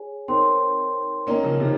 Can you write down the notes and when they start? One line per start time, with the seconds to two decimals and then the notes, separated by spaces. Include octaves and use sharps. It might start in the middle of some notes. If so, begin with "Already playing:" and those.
Already playing: G#4 C#5 G#5
0.28 C4 D#4 A#4 C#5 G5 C6
1.27 A#3 C#4 D#4 A#4 D#5 G5 A#5
1.43 C#3 F3
1.60 C3 D#3